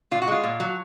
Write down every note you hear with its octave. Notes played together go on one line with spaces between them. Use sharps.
A#2 F4
F#4
G#3 F4
A#2
F#3